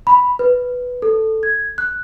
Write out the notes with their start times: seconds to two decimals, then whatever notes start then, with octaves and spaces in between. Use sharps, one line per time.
0.07 B5
0.39 B4
1.02 A4
1.43 G#6
1.78 F#6